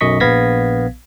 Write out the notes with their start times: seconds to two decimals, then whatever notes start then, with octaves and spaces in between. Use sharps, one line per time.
0.01 B1 F#2 D#5 C#6 B6
0.20 A#1 B3 F5 G#6 A#6 B6